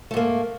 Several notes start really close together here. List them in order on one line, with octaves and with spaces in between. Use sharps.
A3 G#2 A#3